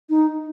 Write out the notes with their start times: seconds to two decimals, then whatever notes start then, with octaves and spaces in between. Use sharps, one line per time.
0.10 D#4